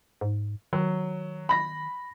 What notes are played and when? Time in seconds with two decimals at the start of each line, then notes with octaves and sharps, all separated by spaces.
0.21 G#2
0.73 D#3 F#3
1.49 B5 A#6